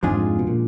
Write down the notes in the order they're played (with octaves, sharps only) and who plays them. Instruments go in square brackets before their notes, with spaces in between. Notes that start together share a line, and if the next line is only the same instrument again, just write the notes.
[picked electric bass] F2 G#2 [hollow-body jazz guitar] F3 G#3 D4 F4 G#4
[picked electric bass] B2
A#2